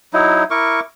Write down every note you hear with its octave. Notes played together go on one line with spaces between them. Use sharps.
F#3 D#4 E4
E4 A#4 C#6 D6